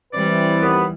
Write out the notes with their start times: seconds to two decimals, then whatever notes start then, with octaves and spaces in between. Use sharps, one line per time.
0.13 E3 G3 C4 E4 B4 D5
0.61 D#2 B3